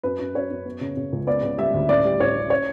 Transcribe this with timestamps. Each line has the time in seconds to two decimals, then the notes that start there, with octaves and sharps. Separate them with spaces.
0.03 F#2 B4
0.19 F#2
0.35 F#2 C#5
0.51 F#2
0.65 B3
0.81 C#3
0.97 C#3
1.13 C#2
1.27 B3 D5
1.43 C#3
1.58 G3 E5
1.74 D2
1.89 A1 D5
2.05 G3
2.20 A1 C#5
2.35 C#4
2.50 C#5